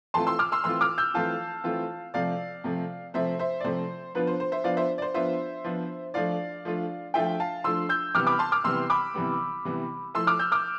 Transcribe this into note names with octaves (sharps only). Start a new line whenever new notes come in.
E3 A3 C4 F4 A5 C6
C6 E6
D6 F6
C6 E6
E3 A3 C4 F4 C6 E6
D6 F6
E6 G6
E3 A3 C4 F4 F5 A5
E3 A3 C4 F4
C3 F3 A3 D5 F5
C3 F3 A3
C3 F3 A3 C5 E5
C5 E5
D5
C3 F3 A3 C5
F3 B3 D4 F4 B4
C5
C5
C5 E5
F3 B3 D4 F4 D5 F5
C5 E5
D5
C5
F3 B3 D4 F4 C5 E5
F3 B3 D4 F4
F3 A3 D4 F4 D5 F5
F3 A3 D4 F4
F3 A3 D4 F4 E5 G5
F5 A5
F3 A3 D4 F4 C6 E6
E6 G6
C3 E3 G3 B3 D6 F6
B5 D6
A5 C6
D6 F6
C3 E3 G3 B3 C6 E6
B5 D6
C3 E3 G3 B3
C3 E3 G3 B3
F3 A3 E4 C6 E6
D6 F6
E6 G6
D6 F6